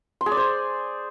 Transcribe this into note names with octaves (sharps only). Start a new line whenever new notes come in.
C6
G#4
D5
C5